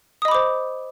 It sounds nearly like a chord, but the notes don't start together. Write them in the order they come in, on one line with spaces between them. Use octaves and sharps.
D#6 D#5 B5 D6 C5